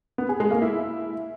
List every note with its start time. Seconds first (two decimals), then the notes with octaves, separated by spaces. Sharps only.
0.18 B3
0.29 G#4
0.40 G#3
0.51 A#3
0.62 E4